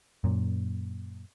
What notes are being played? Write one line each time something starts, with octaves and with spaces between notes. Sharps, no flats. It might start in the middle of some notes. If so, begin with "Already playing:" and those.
F#2 A#2